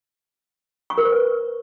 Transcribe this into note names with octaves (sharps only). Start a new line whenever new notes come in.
C#6
A#4
C5
B4